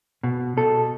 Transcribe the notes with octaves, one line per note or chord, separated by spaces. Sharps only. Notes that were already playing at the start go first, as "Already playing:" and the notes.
B2
B2 A4